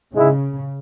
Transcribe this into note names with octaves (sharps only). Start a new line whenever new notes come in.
G#2 C#3 G#3 E4